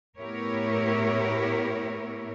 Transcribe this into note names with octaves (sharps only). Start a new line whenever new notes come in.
A2 B3 E4 G4 A#4 C#5